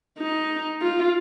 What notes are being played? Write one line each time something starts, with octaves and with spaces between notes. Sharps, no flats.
D#4
F4